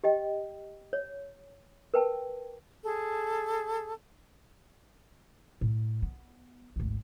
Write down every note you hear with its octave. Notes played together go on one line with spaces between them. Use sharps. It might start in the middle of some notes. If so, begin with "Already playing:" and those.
G4 D#5 G5
C#5
A#4 B4 G5 A5
G#4 A4
A2
B3
G#1 D2